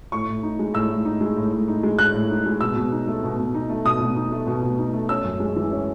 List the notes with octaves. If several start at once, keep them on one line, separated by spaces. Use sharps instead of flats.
A2 C#6
A2
D#4
G#3
A2 E6
A2
D#4
G#3
A2
A2
D#4
G#3
A2 F#6
A2
D#4
G#3
B2 E6
B2
D#4
A3
B2
B2
D#4
A3
B2 D#6
B2
D#4
A3
B2
B2
D#4
A3
C#4 E6
F#2
G#3
E3
C#4